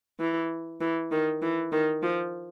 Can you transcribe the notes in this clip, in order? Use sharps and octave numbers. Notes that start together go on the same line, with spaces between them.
E3
E3
D#3
E3
D#3
F3